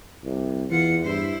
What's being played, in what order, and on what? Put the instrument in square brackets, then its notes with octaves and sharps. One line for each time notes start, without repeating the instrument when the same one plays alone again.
[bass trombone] C2
[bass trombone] E2 [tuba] E3 [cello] F4 F#5
[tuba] G2 [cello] E4 C5